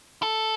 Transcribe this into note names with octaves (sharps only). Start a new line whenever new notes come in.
A4